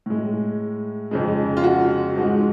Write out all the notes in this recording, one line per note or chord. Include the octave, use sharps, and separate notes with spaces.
A2 G#3
F2 C#3 G#3
F4
F#4
G#2 F3 G#3